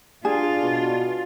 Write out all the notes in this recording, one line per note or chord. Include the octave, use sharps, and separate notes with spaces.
D4 F4 G#4
B2